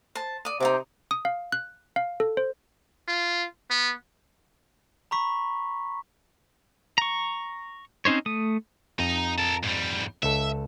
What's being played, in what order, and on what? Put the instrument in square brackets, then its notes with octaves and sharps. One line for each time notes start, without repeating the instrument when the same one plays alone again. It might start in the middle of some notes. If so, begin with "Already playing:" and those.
[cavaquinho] C5 A5
D5 D#6
[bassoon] C3 [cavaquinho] D#4 F#4 D6 [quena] C5
[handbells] D#6
F5
F#6
F5
A4
C5
[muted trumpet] F4
B3
[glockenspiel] A#5 B5 C#6 B6
[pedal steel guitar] A#5 C#6
C4 C#4 D#4 C5 C#5
A3 D#6
[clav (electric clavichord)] F2 [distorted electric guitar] D#4 A#5
[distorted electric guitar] A#4 A5
G#2 G3
[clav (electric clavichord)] C#2 A4 [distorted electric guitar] E5